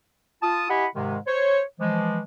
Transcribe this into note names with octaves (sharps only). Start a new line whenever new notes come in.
F4 A5 D#6
E4 G4 D#5 F#5 G#5 B5
G#2 C3 D#3 G#3
C5 C#5
E3 F3 G#3